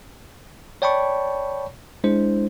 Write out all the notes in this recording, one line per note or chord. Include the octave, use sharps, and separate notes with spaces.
C#5 D5 G5 A5 B5 C#6
G#3 D4 E4 C5